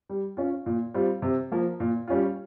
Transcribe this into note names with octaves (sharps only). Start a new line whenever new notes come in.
G3
C#4 F4
A#2
G3 C4 F4
C3
F3 A#3
A#2
G3 C#4 F4